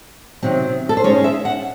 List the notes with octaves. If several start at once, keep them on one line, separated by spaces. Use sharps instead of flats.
C3 D#3 F#3 C4
A4
C5
G#2 D#3 G#3 C#4 C#5
E5
F#5